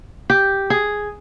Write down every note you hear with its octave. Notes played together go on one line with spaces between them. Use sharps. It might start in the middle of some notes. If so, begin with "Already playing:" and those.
G4
G#4